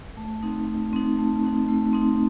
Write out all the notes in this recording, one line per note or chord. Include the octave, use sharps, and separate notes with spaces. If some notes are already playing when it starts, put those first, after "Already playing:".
A3
C4 D#4
A3
C4 D#4
A3
C4 D#4
A3
C4 D#4